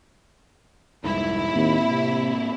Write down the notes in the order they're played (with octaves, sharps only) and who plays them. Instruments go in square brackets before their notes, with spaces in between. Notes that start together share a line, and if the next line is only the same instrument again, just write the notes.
[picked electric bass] F1 C2 G#2 [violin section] E4
[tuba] D#2 [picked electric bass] A2 A#3 C4
[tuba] C3